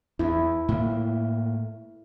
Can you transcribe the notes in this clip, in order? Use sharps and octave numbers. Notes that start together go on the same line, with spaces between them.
E2 E4
A2 A#3